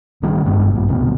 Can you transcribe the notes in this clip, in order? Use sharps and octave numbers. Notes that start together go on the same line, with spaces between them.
B1 D#3 G3
G1 G2 G#3 D4
A#1 G2
D1 C2 B2